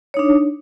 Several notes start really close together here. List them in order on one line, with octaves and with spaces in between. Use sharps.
C#5 D#4 D4